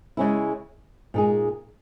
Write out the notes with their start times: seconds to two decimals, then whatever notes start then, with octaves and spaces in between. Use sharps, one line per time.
0.17 C#3 G#3 C#4 E4
1.14 A#2 G#3 D#4 G#4